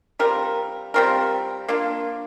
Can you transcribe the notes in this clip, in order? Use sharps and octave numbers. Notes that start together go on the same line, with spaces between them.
G3 C4 F4 A#4
G3 C4 F4 A#4
A#3 D4 F4